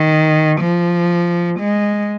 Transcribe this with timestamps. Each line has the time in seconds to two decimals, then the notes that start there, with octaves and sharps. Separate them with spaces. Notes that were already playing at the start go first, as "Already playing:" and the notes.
Already playing: D#3
0.61 F3
1.60 G#3